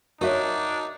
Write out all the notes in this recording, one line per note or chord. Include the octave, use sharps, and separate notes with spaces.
D4 D#4 F#4 A#4 C#5 E5